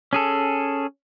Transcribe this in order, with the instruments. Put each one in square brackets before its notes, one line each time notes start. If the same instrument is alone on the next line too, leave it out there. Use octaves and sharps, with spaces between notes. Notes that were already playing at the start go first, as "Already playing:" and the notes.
[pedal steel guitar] C#4 G#4 A4